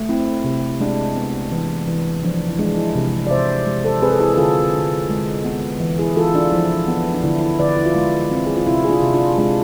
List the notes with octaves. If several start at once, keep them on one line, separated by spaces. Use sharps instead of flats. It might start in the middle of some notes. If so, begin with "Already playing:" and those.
Already playing: A3
C4 E4
C3
G#3 D4
B3
E3
E3
F3 D4
E4
G#3 D4
E4
C3
D5
C3 C5 E5
G#3
A4 C5
C4 G#4 B4
A4
E4 G#4
G#4
D3 F4 A4
D3
G#3
B3
E3
E4 G#4
E3 F4 A4
D4 F4
F3 E4
B3
D4
D3 E4
E4
D3 B4 D5
E4
F4
G#3 E4
C4
G#4
F4
C3 E4
G#4
D4 F4
C3
D4 F4
G#3 D4 F4